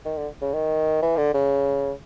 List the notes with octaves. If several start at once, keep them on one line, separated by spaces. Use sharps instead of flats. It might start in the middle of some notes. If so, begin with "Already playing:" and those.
D#3
D3
C#3
D#3
E3
D3
C#3